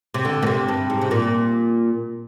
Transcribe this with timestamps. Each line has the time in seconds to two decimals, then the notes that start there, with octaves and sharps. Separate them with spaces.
0.14 C3
0.25 D3
0.42 A#2
0.47 C3
0.68 G2
0.90 G#2
1.01 C3
1.11 A#2